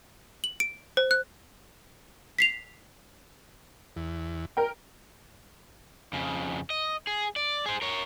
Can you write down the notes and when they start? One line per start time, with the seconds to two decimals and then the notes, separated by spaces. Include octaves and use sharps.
0.44 F#7
0.60 D7
0.97 C5
1.11 F#6
2.39 B6 C7 F7
3.97 E2
4.57 A#4 G5
6.13 F2 C#3
6.70 D#5
7.07 G#4
7.36 D5
7.66 G#4 C5
7.82 A#4 C#5